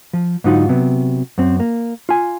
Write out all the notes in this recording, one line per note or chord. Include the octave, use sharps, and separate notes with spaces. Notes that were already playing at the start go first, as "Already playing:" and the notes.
F3
G#2 D3 F#3 D#4 F4 F#4
C3 F#3 B3
F#2 C4
A#3
F4 G#5